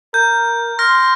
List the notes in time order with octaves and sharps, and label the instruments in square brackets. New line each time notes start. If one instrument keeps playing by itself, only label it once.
[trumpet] A#4 [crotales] G6
[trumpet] C6 [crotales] F6 A#6